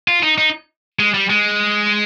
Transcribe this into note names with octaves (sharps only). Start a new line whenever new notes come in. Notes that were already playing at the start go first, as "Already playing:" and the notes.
F4
D#4
D#4
G#3
G3
G#3